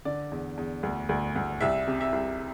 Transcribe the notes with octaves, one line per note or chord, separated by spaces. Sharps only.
D3 D5
E2
E2
D2
D2
D2
C2 E5
C3
E5
C2